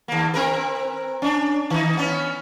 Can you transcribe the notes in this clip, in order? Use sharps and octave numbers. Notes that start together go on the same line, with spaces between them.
D#2 A#3
C4 A#4 B4
C#4 D4
D#3 D#4
B3 C#4